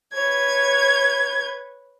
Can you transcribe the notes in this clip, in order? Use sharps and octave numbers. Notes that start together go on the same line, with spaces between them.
B4 C#5 G#6